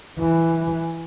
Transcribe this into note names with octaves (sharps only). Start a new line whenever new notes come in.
E3